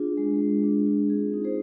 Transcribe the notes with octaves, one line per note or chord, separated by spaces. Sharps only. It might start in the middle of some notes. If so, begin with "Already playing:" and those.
Already playing: D4 F4 G#4
G#3
G#3
D4
F4
C4 G#4
D#4
G#4 C5